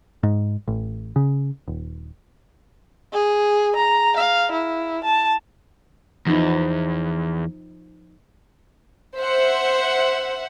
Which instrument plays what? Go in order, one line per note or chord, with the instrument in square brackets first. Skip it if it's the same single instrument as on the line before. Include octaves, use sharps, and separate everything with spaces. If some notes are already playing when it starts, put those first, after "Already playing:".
[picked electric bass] G#2
A1
C#3
D#1
[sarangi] G#4
A#5
F5
E4
A5
[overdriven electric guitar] E2 [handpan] F3 D#4
[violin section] C5 E5 F#5